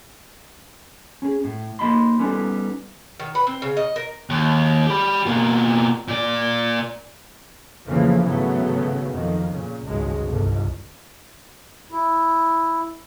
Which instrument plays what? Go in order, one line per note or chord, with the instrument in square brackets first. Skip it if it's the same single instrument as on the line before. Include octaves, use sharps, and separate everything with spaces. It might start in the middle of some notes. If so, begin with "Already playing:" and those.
[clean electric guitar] C#4 G#4
A2
A#3 D#4 D#5 B5 C6
G3 B3 C#4 D#4 G4 A4
[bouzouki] D#3
B4
C4
C#3
D#5
A#4
[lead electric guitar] D#2
G4 B5
B2 A#3
A#2 D5
[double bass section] F2 C#3 E3 F3 A3 A#3
G#1 C#3 F#3 A3 B3
F2 D#3
A#2 C#3
G#1 C#2 G2 F#3 G#3
G1 C2
[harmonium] E4